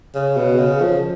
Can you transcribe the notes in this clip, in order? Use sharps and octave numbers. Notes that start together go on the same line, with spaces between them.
C#3
B2
C#3
F3